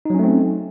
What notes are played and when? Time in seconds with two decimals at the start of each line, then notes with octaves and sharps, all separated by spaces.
0.05 D#4
0.10 F#3
0.15 C#4
0.19 A3
0.24 C4